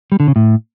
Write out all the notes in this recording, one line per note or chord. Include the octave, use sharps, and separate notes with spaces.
G3
D3
C#3
A2